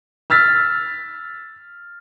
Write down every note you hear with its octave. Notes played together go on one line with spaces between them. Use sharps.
E6 F6 A6 B6